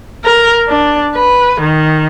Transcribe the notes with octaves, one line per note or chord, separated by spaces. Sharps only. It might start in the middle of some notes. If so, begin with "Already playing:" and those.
A#4
D4
B4
D#3